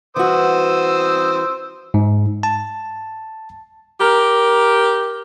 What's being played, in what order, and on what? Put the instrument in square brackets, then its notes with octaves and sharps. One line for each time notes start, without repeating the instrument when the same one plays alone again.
[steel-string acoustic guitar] E3 F#4 [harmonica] C5 D#6 E6
[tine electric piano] G#2
A5
[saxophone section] G4 A#4